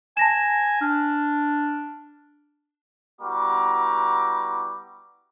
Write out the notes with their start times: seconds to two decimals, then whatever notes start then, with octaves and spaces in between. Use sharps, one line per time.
0.17 G#5 A5 A#6 E7
0.81 D4 F6
3.22 G3 B3 E4 F#4 A#5 D6